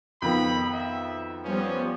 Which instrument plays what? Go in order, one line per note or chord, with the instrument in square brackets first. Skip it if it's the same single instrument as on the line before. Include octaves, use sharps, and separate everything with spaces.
[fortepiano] F2 B2 D#3 [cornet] B5
[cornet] E5
[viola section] F3 G3 B3 [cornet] C#4